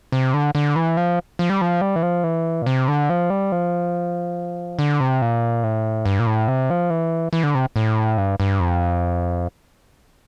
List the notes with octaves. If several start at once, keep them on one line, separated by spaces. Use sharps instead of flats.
C3
D3
D3
E3
F3
F3
G3
F3
G3
E3
F3
E3
A#2
C3
D3
F3
G3
F3
D3
C3
A#2
A2
G2
A#2
A2
C3
F3
E3
E3
D3
C3
A2
G2
G2
F2